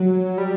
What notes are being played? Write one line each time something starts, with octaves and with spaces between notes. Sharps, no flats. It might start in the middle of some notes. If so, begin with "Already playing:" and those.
Already playing: F#3
G3